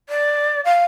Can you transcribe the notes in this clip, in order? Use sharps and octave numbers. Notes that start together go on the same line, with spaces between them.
D5
F5